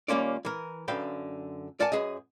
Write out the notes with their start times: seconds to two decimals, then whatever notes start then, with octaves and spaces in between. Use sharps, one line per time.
0.08 D#2 G3 A#3 C#4 F4 D5
0.45 E3 A#4
0.88 F#2 D3 B4 F5 G5
1.80 A#4 D5 F#5 G#5 A5
1.92 F#2 G#4 B4 D#5